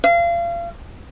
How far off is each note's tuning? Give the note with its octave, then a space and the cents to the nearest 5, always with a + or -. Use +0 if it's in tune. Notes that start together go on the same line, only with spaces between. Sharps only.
F5 -30